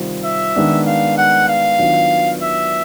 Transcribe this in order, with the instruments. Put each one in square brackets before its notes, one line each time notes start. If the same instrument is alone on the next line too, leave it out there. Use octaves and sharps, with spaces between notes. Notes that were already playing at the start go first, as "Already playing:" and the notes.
Already playing: [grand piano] C3 D#3 G3 C4 F4
[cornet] E5
[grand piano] D#3 G#3 B3 D4
[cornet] F5
F#5
F5
[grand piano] D#3 F#3 B3 D4 F4
[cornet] E5